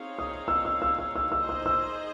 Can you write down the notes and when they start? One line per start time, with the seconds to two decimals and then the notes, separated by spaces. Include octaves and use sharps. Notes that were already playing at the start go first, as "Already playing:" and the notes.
Already playing: C4 D#4 G#4 C#5 F5
0.19 D#6
0.48 E6
0.65 E6
0.82 E6
0.99 E6
1.16 E6
1.32 E6
1.37 D#4 G#4 C5 D#5
1.49 E6
1.66 E6